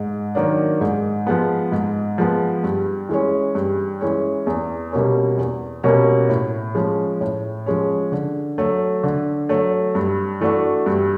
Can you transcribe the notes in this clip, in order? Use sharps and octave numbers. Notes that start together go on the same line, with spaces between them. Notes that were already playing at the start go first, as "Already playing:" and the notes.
Already playing: G#2
D#3 F#3 A#3 D4
G#2
F3 G#3 B3
G#2
F3 G#3 B3
G2
E3 G#3 C#4
G2
E3 G#3 C#4
E2
B2 G3 A#3 C#4
E2
B2 G3 A#3 C#4
A2
F3 G#3 C#4
A2
F3 G#3 C#4
D3
F#3 A3
D3
F#3 A3
G2
E3 A3 D4 F#4
G2